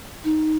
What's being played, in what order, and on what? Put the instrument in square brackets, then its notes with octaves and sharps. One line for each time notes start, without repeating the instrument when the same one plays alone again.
[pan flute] D#4